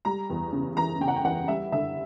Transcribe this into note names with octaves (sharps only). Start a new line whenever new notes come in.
G3 A#5
E2
C#3
E3 A#5
C#3 G5
F#5
G5
E3 F#5
G3 E5
D3 E5